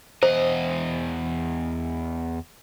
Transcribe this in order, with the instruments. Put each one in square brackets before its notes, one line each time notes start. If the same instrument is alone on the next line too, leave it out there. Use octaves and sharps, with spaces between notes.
[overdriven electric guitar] E2 D#5 [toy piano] C5